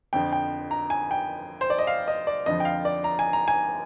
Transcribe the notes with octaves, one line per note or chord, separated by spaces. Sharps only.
F2 D3 F3 G5
G5
A#5
G#5
G5
C5
D5
D#5
F5
D#5
D5
F2 D3 F3 D#5
G5
F5
D5
A#5
G#5
A#5
G#5